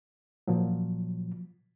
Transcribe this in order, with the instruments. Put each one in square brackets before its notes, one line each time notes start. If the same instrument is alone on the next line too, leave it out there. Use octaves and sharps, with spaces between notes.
[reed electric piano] A#2 F3 F#3